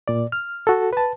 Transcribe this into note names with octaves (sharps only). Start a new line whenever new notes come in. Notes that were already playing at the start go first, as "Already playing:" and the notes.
A#2 D5
F6
F#4 A4
B4 A5